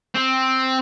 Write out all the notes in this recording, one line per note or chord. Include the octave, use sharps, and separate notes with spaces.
C4